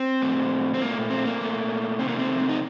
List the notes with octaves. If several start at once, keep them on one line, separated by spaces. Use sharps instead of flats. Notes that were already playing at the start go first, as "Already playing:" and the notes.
Already playing: C4
A#2 A3
C4
A#2 A3 A#3
C4
A#3
A#2 A3
C3 D#3 A3 C4
A#3
C4
D#4